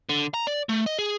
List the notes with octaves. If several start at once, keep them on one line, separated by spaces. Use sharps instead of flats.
D3
A#5
D5
A3
D#5
G#4